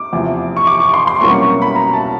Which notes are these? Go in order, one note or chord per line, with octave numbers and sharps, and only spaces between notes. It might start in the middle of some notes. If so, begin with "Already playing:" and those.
Already playing: D6
E2 C3 F3
C#6
D6
C#6
C6
C6
C2 B2 F#3 A#3 C#4 C#6
C#6
B5
A#5
A5